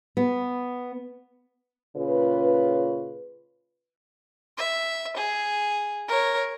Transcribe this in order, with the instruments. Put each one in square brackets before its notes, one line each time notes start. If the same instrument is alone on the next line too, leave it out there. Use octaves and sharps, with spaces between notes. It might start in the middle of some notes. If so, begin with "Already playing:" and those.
[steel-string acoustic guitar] B3
[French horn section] A#2 C#3 C#4 F4 B4
[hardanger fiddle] E5
G#4
A#4 C#5